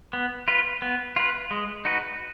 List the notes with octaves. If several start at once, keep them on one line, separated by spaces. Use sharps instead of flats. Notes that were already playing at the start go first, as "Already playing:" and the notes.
B3
F4 B4
B3
F4 B4
G#3
D#4 F#4 B4